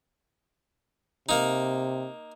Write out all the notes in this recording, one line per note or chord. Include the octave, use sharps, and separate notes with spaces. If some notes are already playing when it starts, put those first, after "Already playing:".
C3 A#3 D#4